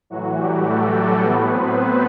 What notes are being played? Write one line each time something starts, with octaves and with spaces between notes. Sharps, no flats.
A2 E3 F#3 F#4
G3 G4
A3 A4
A2 F#3 B3 B4
C4 C5